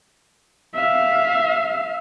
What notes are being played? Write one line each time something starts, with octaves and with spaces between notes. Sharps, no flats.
E5 F5